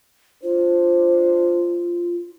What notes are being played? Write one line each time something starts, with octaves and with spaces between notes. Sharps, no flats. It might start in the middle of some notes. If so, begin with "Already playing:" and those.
D4 F4 C5